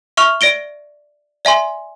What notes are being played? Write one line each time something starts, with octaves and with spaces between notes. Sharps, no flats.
E5 C#6 F6 F7
D5 A#6 D7 G7
D5 E5 G#5 C6